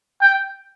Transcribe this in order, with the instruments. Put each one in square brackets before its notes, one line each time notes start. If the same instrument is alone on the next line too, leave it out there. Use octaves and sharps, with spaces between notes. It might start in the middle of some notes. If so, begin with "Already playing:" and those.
[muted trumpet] G5